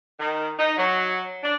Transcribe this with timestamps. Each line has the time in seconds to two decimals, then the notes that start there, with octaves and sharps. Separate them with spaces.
0.20 D#3
0.57 D#4
0.77 F#3
1.43 D4